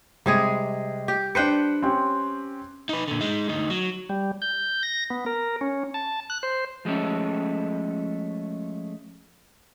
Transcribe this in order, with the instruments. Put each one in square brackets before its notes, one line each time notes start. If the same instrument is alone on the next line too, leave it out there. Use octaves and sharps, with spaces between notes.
[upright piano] C3 [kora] G3 G#3 G#4
[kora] G4
[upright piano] D4 F#6 C#7 [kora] B4 C5 G5
[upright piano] C4 C#4 G4
[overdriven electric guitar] D#4 B4
A#2 D3
G#3 D#4
D2 D#4
F#3
[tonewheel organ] G3
G6
A#6
B3
A#4
C#4
A5
F#6
C5
[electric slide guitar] F3 G#3 A3 C#4 A4